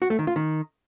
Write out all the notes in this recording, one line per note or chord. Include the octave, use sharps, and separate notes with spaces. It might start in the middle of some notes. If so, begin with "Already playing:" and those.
F#4
A3
D#3
F4
D#3